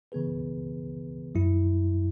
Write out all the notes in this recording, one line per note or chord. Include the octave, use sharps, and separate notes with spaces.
C#3 E3 B3 G#4 B4
F#2 F#3 E4